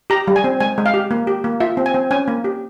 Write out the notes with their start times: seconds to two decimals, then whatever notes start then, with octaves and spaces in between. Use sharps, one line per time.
0.10 G4 A#5
0.28 G3
0.36 G#5
0.44 C4
0.60 G#3 G#5
0.78 G#3
0.86 F5
0.94 G4
1.11 A#3
1.27 G4
1.44 A#3
1.60 F4 E5
1.77 C4
1.86 G#5
1.94 C4
2.11 C#4 G#5
2.28 A#3
2.44 G4